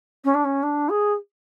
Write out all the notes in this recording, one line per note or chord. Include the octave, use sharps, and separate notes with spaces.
C#4
D4
C#4
D4
G#4